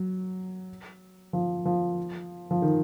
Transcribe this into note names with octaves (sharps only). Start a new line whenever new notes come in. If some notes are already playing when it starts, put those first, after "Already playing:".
Already playing: F#3
F3
F3
F3
D#3